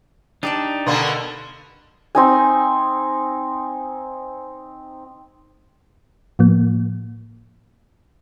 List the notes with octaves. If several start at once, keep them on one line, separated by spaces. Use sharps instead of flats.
D4 D#4 G4 D5 A5
B2 D3 A#3 B3 C6 E7
C4 D#4 G#5
A2 F3 A#3